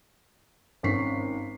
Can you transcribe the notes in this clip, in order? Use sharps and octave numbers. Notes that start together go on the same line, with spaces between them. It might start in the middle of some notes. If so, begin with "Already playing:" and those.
G#1 C#4 C#6 B6 C7